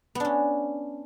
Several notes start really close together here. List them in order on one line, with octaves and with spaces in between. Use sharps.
B3 D4 C#4